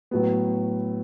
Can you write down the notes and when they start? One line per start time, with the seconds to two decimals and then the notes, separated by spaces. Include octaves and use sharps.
0.11 A2 F#3 B3